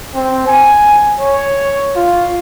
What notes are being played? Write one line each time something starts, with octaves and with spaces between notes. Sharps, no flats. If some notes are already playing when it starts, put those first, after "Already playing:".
C4
G#5
C#5
F4